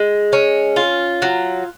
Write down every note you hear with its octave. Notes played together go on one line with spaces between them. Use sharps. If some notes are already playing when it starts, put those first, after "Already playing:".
Already playing: G#3
C#4
F4
F#3